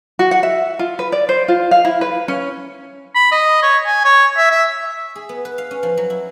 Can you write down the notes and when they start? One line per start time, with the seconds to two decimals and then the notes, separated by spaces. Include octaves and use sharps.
0.19 F#4
0.31 F#5
0.43 E5
0.79 F4
0.99 B4
1.12 D5
1.29 C5
1.48 F4
1.71 F5
1.85 E4
2.01 B4
2.28 C#4
3.15 B5
3.32 D#5
3.63 C#5
3.86 G#5
4.04 C#5
4.37 E5
4.51 E5
5.16 G#4
5.29 B3
5.45 B4
5.58 F5
5.71 C#4
5.83 F3
5.97 F#3
6.10 E4